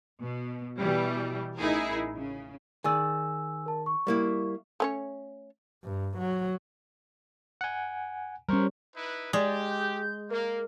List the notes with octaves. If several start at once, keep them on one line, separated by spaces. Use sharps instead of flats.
B2
B2 E3 G3
A1 D#4 E4 G#4 A#4
C#3
D#3 G#4 D5 G#5 E6
A#4 A5
C#6
G3 A#3 E4
A3 C#4 C#5
G2
F#3
F#5 G#5
G3 C#4 A#4 C5 C#6
D#4 E4 B4
G#3 G4 D5
G6
A#3 A#4